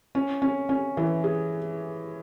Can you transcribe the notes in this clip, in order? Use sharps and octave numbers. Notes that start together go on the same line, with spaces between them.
C#4
C#4
C#4
E3
G#4